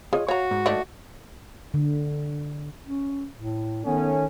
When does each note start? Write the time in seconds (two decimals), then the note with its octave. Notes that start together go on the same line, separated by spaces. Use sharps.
0.13 F4 G#4 C#5 D#5
0.28 F#4 C#5 F5 A#5
0.51 G#2
0.66 D#3 A3 D4
1.74 D3
2.86 C#4
3.37 A2
3.85 D#3 A3 B3 C#4